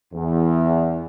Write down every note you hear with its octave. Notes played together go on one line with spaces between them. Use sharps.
E2